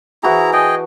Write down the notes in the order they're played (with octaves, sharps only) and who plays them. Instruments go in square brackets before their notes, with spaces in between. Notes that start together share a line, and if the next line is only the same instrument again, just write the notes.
[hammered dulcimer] E3 F#4 G#4 [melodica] E4 A#5
[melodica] G#4 D#5 G5 [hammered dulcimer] A5